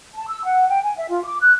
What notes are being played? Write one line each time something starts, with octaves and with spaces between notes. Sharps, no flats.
A5
E6
F#5
G5
G#5
E5
F4
D6
F#6